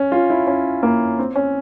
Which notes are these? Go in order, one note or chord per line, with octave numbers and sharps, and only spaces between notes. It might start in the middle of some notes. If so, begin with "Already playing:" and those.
Already playing: C#4
F4
E4
C#4
A#3
C4
C#4